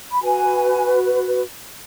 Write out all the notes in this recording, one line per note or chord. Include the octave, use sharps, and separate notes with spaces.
B5
F#4 B4 G#5